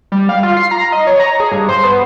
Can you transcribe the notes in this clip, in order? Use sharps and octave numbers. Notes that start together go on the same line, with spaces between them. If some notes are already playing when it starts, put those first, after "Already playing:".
G3
F5
F4
C7
A#5
D#5
C#5
A#5
G#4
G2
C5
B3